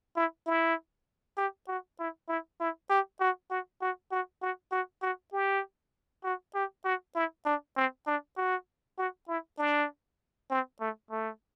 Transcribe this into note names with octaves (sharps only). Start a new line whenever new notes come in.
E4
E4
G4
F#4
E4
E4
E4
G4
F#4
F#4
F#4
F#4
F#4
F#4
F#4
G4
F#4
G4
F#4
E4
D4
C4
D4
F#4
F#4
E4
D4
C4
A3
A3